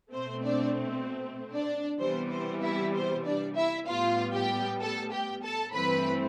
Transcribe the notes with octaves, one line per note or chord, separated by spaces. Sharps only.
B2 A3 C4 C5
D4 D5
D4 D5
C3 E3 G3 B3 C5
C5
E4 E5
C5
D4 D5
E4 E5
A2 G3 B3 F4 F5
G4 G5
A4 A5
G4 G5
A4 A5
G2 E3 A3 C4 B4 B5